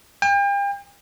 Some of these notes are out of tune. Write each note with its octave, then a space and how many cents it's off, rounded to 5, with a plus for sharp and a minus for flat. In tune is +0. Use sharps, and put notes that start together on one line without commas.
G5 +40